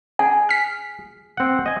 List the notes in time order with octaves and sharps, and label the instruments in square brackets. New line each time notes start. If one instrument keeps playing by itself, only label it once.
[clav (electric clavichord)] G#4 [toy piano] G#5
[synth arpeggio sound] F6 B6
[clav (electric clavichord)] C4 F#5
D#5 G#5